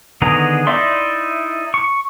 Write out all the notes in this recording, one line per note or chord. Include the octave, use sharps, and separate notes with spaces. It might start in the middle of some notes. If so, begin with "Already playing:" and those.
D3 D#3 B3 G#4 A#5
D#4 E4 D5 E5 C6
C#6